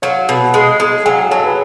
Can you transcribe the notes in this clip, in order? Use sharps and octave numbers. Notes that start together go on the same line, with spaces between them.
F#3 C#5 F5
B2
G#3
G#3
F#3 F5 G#5
F5 G#5
F#3 A4 C#5
G#4 B4